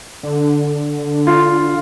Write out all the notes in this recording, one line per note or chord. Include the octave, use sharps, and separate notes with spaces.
D3
F4